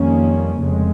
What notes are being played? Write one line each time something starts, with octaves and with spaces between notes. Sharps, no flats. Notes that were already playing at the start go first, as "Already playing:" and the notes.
Already playing: F2 D#3 G3 A#3 C#4
F1 F2 C#3 G#3